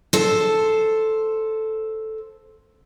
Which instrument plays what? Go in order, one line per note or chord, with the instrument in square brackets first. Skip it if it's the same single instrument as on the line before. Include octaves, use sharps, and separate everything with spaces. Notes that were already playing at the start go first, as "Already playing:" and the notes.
[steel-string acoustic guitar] A4 C5